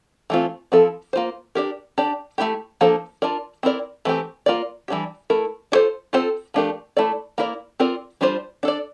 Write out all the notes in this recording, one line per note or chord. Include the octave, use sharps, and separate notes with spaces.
E3 A3 C4 F4
F3 C4 E4 A4
A#3 F4 C5
D4 G4 A#4
D4 G4 D5
A3 C4 E4 G4
F3 A#3 D4 A4 C5
D4 F4 A#4 D5
C4 E4 A#4 D5
E3 A3 C4 G4
A#3 F4 A#4 D5
E3 G3 D4 G4
A3 E4 A#4
D4 F4 A4 C5
C4 F4 A4 C5
F3 A3 D4 G4 A#4
A3 E4 A4 D5
A#3 E4 A#4 D5
C4 F4 A#4 D5
G3 D4 F4 C5
D4 A4 D5